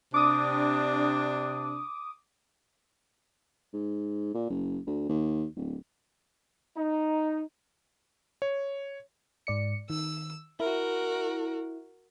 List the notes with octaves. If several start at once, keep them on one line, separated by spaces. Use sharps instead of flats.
C3 D4 D6 D#6
G#2
A#2
F#1
D2
D#2
D1
D#4
C#5
G#2 D5 C#7
D#3 E6
E4 F#4 A#4